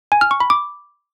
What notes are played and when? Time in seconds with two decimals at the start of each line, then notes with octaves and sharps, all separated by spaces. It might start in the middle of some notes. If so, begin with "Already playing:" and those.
0.12 G#5
0.21 F6
0.31 C#6
0.40 B5
0.50 D6